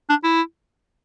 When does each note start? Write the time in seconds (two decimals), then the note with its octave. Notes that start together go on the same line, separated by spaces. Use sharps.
0.09 D4
0.24 E4